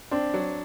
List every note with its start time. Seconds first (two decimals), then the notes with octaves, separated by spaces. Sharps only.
0.11 C4 D4
0.34 F#3